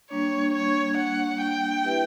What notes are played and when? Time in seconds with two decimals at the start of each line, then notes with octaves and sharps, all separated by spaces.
0.11 G3 A#3 D4 C#5
0.54 C#5
0.97 F#5
1.41 G5
1.85 E4 G4 B4 E5